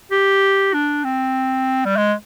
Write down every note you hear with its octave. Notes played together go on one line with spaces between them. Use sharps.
G4
D4
C4
G3
G#3